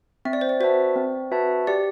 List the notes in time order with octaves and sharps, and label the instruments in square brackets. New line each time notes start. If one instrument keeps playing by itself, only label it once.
[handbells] C4 [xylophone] E5
[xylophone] D5
C5
D5
[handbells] F#4 B4 E5 A5 [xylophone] C5
[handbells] C4
F#4 B4 E5 A5
[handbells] G4 [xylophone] D5